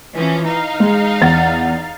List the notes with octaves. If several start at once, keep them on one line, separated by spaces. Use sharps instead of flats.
E3 F3 C#4
D#4 F5
G#3
E2 F#5 A6